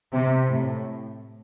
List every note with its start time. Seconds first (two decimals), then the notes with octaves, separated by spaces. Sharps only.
0.14 C3
0.49 A2